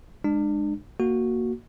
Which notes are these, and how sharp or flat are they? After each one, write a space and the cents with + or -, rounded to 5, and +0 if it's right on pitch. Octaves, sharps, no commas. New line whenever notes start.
G#3 -5 D4 +35
A#3 +0 F#4 +0